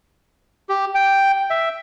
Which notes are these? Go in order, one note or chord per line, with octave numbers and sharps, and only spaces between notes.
G4
G5
E5